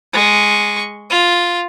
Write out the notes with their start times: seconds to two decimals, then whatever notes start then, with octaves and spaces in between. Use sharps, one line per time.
0.13 G#3 C#6
1.10 F4